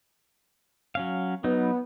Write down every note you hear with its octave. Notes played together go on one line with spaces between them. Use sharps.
F#3 C#4 F5
F#3 B3 D#4